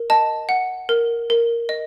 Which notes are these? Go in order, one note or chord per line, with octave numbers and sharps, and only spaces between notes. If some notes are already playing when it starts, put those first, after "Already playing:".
Already playing: A#4
D#5 A5
F#5
A#4
A#4
D#5